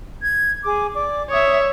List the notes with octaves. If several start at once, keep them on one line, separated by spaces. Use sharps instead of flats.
G#6
G#4 D6
D5 D6
C#5 E5 D#6